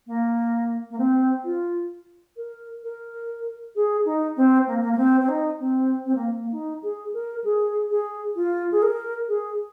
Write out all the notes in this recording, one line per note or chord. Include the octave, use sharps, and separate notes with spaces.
A#3
A#3
C4
F4
A#4
A#4
G#4
D#4
C4
A#3
A#3
A#3
C4
C4
D#4
C4
C4
A#3
A#3
D#4
G#4
A#4
G#4
G#4
F4
G#4
A#4
G#4